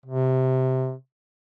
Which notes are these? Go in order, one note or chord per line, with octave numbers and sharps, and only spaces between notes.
C3